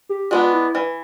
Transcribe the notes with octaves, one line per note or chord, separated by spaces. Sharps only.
G4
G#3 B3 D4 F4
E4
E3